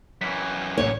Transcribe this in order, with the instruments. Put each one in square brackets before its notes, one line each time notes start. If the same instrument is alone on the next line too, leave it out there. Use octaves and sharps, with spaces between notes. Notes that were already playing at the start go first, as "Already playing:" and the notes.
[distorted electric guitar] F#2 E3 [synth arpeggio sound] B6
[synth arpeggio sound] G1 C2 A2 [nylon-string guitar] C#5